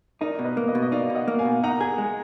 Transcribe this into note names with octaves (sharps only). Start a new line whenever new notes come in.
D#4 A#4 D5
B2
B4 D#5
A#3
B4 D#5
B2
D#5
D#4 D5 F5
B2
D#5 F#5
A#3
F5 G#5
B2
D#4 F#5 A#5
G#4
G#3